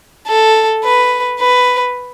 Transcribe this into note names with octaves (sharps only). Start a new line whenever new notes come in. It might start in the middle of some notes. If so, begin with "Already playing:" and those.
A4
B4
B4